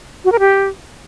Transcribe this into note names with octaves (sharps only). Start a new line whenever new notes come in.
F#4
A#4
G4